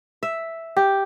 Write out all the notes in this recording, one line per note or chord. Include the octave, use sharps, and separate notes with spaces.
E5
G4